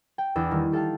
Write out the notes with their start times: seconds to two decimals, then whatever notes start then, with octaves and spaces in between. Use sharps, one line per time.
0.18 G5
0.36 E2 D4 D5 E6 G6
0.51 D#3 G3
0.72 G4 A4 F5 G5 A5